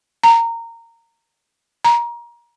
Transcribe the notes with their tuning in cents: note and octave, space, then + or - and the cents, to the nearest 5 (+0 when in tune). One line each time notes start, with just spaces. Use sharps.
A#5 -20
A#5 +25